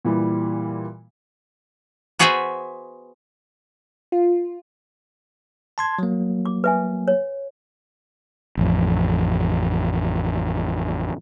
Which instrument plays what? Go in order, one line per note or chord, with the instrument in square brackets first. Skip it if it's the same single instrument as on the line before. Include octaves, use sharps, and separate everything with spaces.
[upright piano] A#2 E3 G3
[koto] B3 F#4 G#4 B4 C5 E5
[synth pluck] F4
[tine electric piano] A5 C6 G#6
F#3 A#3
[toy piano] D6
B4 E5 G#5
C#5
[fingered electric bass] A1 F2